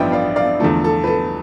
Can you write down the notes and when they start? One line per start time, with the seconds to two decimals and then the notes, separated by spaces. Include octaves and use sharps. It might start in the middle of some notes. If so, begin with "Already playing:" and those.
Already playing: A1 G2 F3 B3 D4 E5 G5
0.12 D5 F5
0.36 D5 F5
0.60 E2 D3 F3 A3 A4
0.84 A4
1.04 B4
1.07 A4